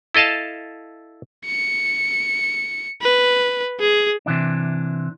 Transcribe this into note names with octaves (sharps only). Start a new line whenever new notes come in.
E4 A4 D#5 F5 A5
C#7
B4
G#4
C3 E3 D4